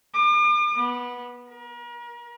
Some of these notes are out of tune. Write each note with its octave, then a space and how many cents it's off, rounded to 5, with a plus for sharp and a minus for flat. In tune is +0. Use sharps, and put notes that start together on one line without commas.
D6 +40
B3 -15
A#4 +40